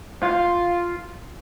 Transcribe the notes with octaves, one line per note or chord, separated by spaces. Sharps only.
F4